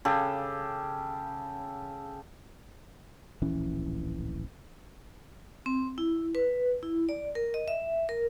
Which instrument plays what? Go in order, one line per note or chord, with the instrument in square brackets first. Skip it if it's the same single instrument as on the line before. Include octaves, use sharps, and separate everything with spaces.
[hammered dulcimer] C#3 G4 A4
[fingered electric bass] D1 A#1 E3 C#4
[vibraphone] C4
E4
B4
E4
D5
A#4
D#5
E5
A#4